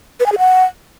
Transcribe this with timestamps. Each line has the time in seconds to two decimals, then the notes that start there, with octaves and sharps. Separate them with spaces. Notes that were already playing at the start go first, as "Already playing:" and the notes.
0.20 B4
0.26 G#5
0.32 G#4
0.38 F#5